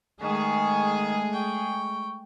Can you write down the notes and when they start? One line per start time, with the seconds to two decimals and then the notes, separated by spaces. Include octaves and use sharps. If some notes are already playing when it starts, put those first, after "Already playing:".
0.21 D#3 G#3 A3 G#4 C#6
1.33 G5 C#6